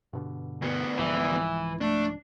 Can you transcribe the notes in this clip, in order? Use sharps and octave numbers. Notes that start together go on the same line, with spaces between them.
G2 B2 D3
D2 B3
C2 G#2 E3 F3
A3 D4